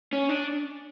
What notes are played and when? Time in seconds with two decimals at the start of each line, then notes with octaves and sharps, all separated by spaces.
0.13 C#4
0.29 D4